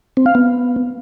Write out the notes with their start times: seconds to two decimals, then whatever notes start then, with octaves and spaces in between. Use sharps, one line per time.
0.17 C4
0.26 F5
0.35 B3